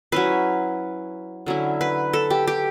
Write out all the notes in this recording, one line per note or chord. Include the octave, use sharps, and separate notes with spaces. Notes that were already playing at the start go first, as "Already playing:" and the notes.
F#3 C#4 E4 B4
D3 F#3 C#4 E4
B4
A4
G4
G4